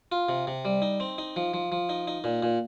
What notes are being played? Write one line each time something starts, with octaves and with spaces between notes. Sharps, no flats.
F4
C3
C3
G3
D#4
C4
D#4
F3
F3
F3
D#4
D#4
A#2
A#2